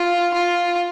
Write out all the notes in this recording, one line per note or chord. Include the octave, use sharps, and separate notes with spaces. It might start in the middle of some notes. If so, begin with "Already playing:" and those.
Already playing: F4
F4